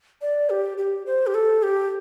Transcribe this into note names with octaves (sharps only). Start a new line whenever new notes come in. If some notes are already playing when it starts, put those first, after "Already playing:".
D5
G4
G4
C5
G4
A4
G4